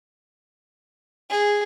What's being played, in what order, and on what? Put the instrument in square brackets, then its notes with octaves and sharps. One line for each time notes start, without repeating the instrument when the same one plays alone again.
[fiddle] G#4